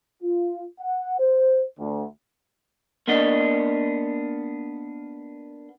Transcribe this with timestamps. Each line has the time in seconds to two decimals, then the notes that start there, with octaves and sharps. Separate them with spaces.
0.23 F4
0.80 F#5
1.19 C5
1.79 D2
3.08 A#3 B3 D4 D#5